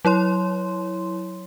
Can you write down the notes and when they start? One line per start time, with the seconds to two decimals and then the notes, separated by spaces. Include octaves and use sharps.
0.05 F#3 E4 C#5 C6